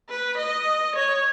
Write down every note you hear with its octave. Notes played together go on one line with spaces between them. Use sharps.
B4
D#5
C#5